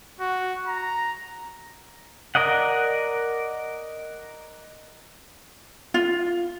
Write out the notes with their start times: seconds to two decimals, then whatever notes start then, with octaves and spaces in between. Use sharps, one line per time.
0.20 F#4
0.67 A#5
2.35 A#4 D5 D#5 F#5
5.94 F4